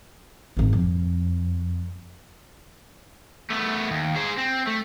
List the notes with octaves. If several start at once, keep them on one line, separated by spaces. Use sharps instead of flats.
G#1 D#3
F2
A3 B3
D#2
G#4 C5
C4
A3